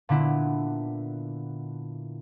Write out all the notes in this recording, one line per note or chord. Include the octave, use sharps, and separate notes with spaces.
A#2 D3 B3 E4